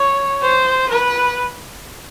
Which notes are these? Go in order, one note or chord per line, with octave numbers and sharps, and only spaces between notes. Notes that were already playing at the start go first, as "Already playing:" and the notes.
Already playing: C#5
C5
B4